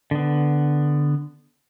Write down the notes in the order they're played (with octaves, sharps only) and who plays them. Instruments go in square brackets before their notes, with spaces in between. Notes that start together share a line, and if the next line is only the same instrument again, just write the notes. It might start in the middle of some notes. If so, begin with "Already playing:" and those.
[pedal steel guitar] D3 B3